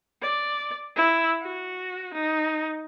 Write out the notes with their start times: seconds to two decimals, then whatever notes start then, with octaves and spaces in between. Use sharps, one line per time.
0.22 D5
0.96 E4
1.42 F#4
2.13 D#4